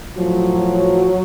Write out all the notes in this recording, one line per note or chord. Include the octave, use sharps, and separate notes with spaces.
A2 F3 F#3